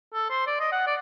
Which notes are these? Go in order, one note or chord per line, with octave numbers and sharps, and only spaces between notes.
A4
C5
D5
D#5
F#5
D5